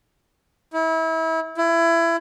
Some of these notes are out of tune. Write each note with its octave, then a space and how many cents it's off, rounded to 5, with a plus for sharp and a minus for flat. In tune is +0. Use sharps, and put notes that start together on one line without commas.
E4 -30
E4 +25